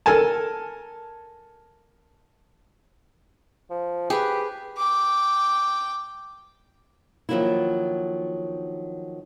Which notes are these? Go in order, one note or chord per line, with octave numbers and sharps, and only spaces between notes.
A4 A#4 G#5 A5
F3
G4 G#4 B4
G5 D6
D#3 F3 F#3 A#3 D4 E4